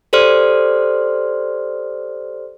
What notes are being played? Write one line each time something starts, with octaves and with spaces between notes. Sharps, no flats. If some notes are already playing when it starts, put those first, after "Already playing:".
G4 A4 C5 D5 C6 F6